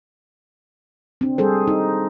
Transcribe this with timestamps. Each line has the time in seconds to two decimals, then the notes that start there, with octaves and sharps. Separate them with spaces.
1.21 C4 D4
1.38 G3 G#4 A4 C5
1.68 D#4